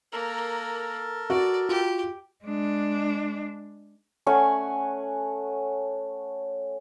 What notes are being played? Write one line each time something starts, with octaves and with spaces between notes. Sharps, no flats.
A#3 A4 A#4
F#4 D5
F4 G4
G#3 D4
A3 C#4 F#5 G#5